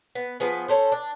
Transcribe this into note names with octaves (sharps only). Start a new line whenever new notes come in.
B3
F3 B3 G#4
C#4 A4 C5
D4